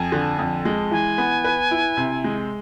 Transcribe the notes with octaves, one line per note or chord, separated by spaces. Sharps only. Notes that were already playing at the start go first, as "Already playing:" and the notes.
Already playing: F2 G#5
D3
F2
G#3
E3 G#5
B3
B4
E4
C3
G#3